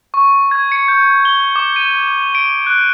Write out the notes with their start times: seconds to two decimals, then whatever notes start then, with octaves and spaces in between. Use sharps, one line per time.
0.14 C#6
0.51 G#6
0.72 C#7
0.88 G6
1.25 G7
1.56 D6
1.76 D#7
2.35 D7
2.67 F#6